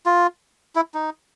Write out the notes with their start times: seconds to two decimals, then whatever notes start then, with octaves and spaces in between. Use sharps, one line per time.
0.06 F4
0.76 E4
0.94 D#4